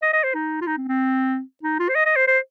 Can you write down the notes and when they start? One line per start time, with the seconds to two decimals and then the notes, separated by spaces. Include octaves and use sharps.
0.02 D#5
0.13 D#5
0.24 C5
0.34 D#4
0.61 F4
0.67 D#4
0.77 C4
0.88 C4
1.63 D#4
1.79 F4
1.89 C5
1.95 D#5
2.05 D#5
2.16 C5
2.27 C5